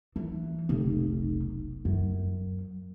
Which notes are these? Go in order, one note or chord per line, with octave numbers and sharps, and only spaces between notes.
E3
F1 B1
F#2